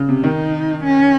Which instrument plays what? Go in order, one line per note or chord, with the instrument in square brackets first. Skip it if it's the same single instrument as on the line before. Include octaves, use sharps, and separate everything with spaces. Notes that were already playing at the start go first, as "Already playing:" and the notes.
Already playing: [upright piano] C#3
C3
[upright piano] D#3 [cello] D#4
[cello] C#4